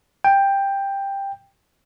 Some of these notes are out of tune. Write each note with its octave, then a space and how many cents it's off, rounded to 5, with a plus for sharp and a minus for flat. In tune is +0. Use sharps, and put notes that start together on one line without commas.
G5 +10